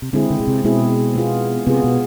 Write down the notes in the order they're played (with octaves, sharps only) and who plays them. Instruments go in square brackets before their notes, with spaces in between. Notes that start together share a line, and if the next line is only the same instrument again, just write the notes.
[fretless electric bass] C3
[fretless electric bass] D3 [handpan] G#3 C4 E4 G#4
[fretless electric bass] D3
B2
C3
[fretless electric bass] B2 [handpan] G#3 C4 E4 G#4
[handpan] B3 F4 G#4
[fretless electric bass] C3 [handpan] B3 F4 G#4
[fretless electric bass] B2